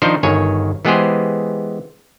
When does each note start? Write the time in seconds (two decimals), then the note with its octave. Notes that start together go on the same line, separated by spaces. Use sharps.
0.02 D#3 F3 D4 D#4 A#4 C5
0.23 G1 D#3 C#5 G#5
0.85 E3 G#3 B3 G4 G#4 C5